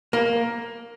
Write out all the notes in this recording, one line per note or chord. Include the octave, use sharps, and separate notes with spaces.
A#3